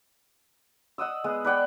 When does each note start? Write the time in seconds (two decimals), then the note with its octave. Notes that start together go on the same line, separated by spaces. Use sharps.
0.98 D#5 F#5 D#6 E6
1.24 G#3 B3
1.45 B4 D5 F#5 G5